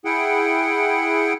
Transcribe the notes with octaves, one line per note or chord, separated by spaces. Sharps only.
E4 G#4 F#5 G5